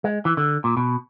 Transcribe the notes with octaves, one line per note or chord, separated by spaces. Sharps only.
G#3
E3
D3
A#2
B2